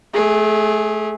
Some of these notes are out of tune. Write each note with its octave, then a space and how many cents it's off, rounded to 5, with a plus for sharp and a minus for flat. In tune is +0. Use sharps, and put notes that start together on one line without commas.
A3 -25 G#4 +0